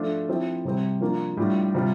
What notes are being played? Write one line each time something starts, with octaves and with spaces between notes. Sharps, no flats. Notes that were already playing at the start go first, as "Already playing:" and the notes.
Already playing: F3 A3 D4 F4
F3 C4 E4
C3 G3 C4
F3 A#3 D4 F4
A2 G3 D4 F4
C3 G3 C4 F4